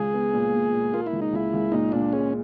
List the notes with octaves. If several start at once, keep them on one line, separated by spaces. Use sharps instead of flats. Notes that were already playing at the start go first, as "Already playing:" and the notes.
Already playing: C#2 G#4
B3
A#2
A#2
A#2
A#3 F4
E4
C#2
D#4
C#2 E4
C#2
A#2 D#4
A#2 D4
G#3 C#4